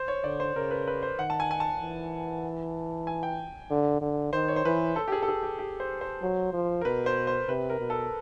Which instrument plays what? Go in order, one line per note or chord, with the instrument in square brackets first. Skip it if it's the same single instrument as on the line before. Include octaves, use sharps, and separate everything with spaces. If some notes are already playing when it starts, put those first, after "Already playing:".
Already playing: [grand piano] C5
C#5
[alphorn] D3 [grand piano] D5
[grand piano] C5
[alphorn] C#3 [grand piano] A#4
[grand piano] B4
B4
C5
[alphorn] D#3 [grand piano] F#5
[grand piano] A5
G#5
G#5
A5
[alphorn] E3
[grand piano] G#5
G5
[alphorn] D3
D3
[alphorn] D#3 [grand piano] C5
[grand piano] C#5
C5
[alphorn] E3 [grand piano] B4
[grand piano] A4
G4
G#4
A4
G#4
G4
G4
C5
C5
[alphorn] F#3
F3
[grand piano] A#4
[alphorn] B2 [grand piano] B4
[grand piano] C5
C5
[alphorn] C3 [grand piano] B4
[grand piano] A#4
[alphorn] B2
[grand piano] A4